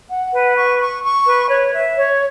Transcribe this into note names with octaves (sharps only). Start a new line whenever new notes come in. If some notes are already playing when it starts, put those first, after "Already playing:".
F#5
B4
C#6
C#6
C#6
B4
C#5
E5
C#5